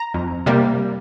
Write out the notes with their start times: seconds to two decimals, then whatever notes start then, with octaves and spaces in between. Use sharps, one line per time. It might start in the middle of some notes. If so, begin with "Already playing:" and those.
Already playing: A#5
0.14 F2
0.46 C3 G3 A#3